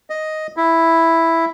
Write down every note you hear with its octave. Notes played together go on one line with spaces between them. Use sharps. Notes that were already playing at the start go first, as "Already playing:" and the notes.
D#5
E4